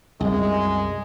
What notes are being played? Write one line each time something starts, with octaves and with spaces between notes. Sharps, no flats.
C2 F#2 G#3